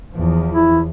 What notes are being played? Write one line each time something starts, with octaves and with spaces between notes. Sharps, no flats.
E2 F3
E4